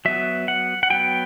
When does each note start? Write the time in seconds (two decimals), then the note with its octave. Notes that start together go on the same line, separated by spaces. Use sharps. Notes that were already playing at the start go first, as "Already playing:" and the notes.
0.05 F#3 B3 E5
0.48 F#5
0.83 F#5
0.90 F#3 B3 G5